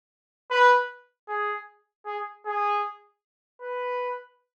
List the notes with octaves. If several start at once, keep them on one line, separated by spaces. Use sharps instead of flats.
B4
G#4
G#4
G#4
B4